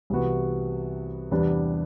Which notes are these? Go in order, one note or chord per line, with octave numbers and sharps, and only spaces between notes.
C2 C3 E3 B3 F#4
E2 C3 G3 B3 D4